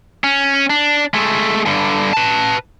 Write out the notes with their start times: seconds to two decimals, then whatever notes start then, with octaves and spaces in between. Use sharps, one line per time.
0.24 C#4
0.70 D4
1.14 G#3 A3
1.66 G2 D3
2.13 B4 A5